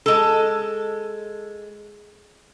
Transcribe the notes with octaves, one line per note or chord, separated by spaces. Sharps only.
G#3 A4